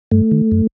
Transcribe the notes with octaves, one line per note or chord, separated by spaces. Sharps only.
G2 A3
D#3
F#2